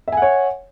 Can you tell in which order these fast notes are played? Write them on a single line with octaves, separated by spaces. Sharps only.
E5 G#5 F#5 C#5